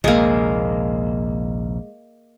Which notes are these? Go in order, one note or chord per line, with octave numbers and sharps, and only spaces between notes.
A#1 D#2 C3 G#3 A#3